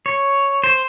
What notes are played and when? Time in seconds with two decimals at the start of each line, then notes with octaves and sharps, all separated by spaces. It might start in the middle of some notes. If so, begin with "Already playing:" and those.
0.06 C#5
0.64 C5